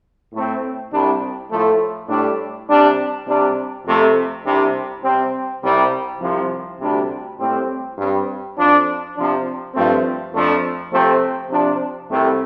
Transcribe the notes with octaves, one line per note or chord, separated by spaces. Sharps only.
A2 A3 C4
C2 C3 G3 D4
A2 F3 A3
A2 G3 D4
C3 G3 D4
C3 G3 D4
F2 C3 A3
C2 C3 G3 D4
C3 G3 C4
C2 C3 G3 C4
C2 C3 F3
D2 C3 G3 D4
A2 G3 C4
G2 G3 C4
F2 F3 D4
C3 F3 D4
G2 F3 A3 C4
F2 F3 A3 D4
C3 F3 A3 C4
C3 F3 D4
C2 C3 A3 C4